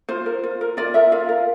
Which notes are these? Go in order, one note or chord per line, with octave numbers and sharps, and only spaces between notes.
F4 C5
A#4
F4
A#4
F4 D5
A#4 E5
F4 F5
A#4